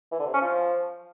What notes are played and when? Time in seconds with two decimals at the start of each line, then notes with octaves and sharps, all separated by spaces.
0.12 E3
0.19 D3
0.27 C3
0.34 C#4
0.41 F3